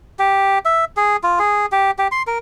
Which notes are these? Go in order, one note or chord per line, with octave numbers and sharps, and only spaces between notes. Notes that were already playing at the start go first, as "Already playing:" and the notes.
G4
E5
G#4
F4
G#4
G4
G4
C6
A#4